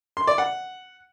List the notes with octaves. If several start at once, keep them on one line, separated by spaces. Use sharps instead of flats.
C6
D5
F#5